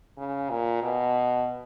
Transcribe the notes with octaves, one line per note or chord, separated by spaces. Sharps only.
C#3
A#2
B2